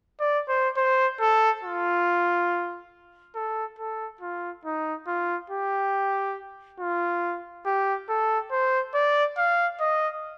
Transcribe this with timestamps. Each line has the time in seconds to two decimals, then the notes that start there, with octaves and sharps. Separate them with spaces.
0.20 D5
0.49 C5
0.77 C5
1.20 A4
1.63 F4
3.35 A4
3.79 A4
4.21 F4
4.65 D#4
5.07 F4
5.50 G4
6.80 F4
7.65 G4
8.09 A4
8.51 C5
8.94 D5
9.37 F5
9.80 D#5